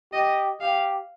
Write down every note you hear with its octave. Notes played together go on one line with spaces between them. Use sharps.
G4 D#5
G4 F5